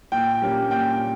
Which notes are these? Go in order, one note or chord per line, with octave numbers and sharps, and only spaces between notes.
A#2 G5
G3 A#3 C#4
A#2 G5